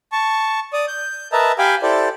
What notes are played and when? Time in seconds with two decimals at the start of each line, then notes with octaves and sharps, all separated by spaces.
0.12 A5 C#6
0.73 D5 D#6
0.88 G6
1.32 A#4 B4 D#5 E5 A5 A#5
1.58 G4 F5 G5 G#5 B5 D6
1.82 E4 G4 A4 C5 D5